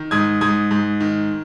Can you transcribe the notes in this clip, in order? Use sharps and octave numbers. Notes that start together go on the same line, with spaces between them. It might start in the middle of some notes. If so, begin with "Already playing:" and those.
Already playing: D#3
G#2 D#6 G#6
G#2 D#6 G#6
G#2
D#3